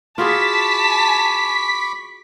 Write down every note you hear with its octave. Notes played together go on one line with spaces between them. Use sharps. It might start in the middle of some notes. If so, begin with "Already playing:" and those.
F4 F#4 G#4 A5 B5 C#6 D6 B6